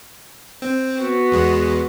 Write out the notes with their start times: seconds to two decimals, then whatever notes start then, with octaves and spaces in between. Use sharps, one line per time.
0.62 C4
0.98 B3 F#4
1.32 E2 G#3